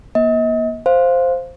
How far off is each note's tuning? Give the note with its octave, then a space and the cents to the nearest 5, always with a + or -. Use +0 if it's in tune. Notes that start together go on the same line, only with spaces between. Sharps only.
A#3 +35 D#5 +40
C5 +0 F5 +0